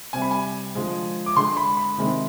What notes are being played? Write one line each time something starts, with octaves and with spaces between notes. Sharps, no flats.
C3 G3 G#5
B5
G#5
D3 F3 G#3
D6
D3 G#3 C6
B5
B5
C3 D#3 G#3